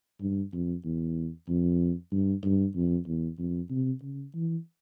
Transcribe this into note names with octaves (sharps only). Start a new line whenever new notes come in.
G2
F2
E2
F2
G2
G2
F2
E2
F2
C3
C#3
E3